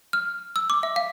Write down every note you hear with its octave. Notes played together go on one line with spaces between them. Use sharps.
F6
E6
D6
E5
F5